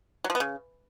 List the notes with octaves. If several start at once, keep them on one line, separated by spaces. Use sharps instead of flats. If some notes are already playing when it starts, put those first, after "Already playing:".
F#3
F3
B3
C#3